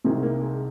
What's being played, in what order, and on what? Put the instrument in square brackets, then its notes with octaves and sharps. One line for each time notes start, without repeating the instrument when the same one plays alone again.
[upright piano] C2 C3 D#3 G#3
A#3
G#3